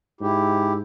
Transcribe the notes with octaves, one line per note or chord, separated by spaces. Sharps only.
G#2 E4 G4